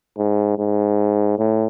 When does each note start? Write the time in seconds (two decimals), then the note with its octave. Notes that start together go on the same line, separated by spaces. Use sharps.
0.18 G#2
0.58 G#2
1.38 A2